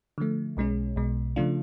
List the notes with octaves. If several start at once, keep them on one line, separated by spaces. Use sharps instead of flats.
D3 F3 A3
B1 B2 G#3 C#4
B1 B2 G#3
C#3 F3 A3 D4 F4